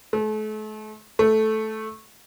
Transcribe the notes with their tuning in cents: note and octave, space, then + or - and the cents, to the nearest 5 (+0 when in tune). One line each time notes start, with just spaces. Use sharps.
A3 -40
A3 -10